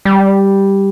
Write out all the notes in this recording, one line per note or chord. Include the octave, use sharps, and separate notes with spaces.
G3